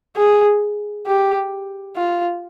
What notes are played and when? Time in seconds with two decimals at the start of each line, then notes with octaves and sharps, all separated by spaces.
0.16 G#4
1.07 G4
1.96 F4